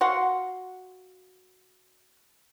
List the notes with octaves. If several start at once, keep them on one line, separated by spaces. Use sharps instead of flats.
F#4 F5 F#5 C6